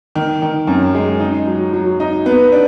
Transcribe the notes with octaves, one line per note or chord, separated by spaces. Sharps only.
D#3
D#3
F#2
G#3
D#4
F#3
F#3
D#4
B3
D4